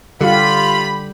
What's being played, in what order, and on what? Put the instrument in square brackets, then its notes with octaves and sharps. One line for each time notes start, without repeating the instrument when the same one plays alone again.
[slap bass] D3 [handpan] G3 G4 [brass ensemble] F4 [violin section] B5